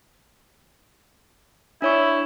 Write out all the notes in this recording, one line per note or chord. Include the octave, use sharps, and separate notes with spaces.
D4 E4 C#5 C#6